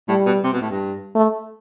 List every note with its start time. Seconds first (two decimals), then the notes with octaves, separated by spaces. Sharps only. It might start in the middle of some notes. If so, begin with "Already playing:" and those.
0.09 A2 G3
0.26 B2
0.44 C3
0.53 B2
0.62 A2
0.71 G2
1.15 A3